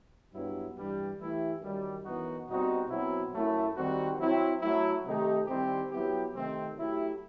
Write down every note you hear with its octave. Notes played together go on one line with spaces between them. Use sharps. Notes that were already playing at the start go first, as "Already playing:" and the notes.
G2 F#3 B3 E4
G2 E3 G3
E3 A3 E4 G4
F#2 D#3 G3
F#2 E3 B3 D#4 F#4
B2 G3 C4 D#4 F#4
B2 F#3 C4 E4
F#2 F#3 A3 E4
D#3 G3 C4 F#4
F#3 C4 E4
F#3 A3 E4
C3 D#3 A3 D#4 G4
D#3 G3 C4 E4 G4
F#3 B3 E4 G4
C3 D#3 A3 C4
F#3 A3 E4 G4